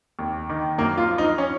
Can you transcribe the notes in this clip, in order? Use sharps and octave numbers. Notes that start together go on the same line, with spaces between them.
D#2
D#3
F#2 A#3
F4
F3
D#4
C#4